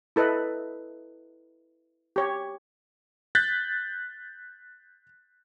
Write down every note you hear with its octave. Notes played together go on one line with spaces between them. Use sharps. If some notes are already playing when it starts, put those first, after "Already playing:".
E4 A4 B4 D#5
G4 C#5
F#6 G6 A6 B6